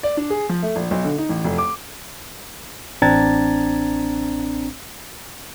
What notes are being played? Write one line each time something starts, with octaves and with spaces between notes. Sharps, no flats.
D5
D4
G#4
F3
A3
A#1
B1
D3
D#4
A1
F1
D6
A1 C4 D4 A#5 G#6 A6